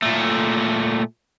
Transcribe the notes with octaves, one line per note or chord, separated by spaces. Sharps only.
A#2 A3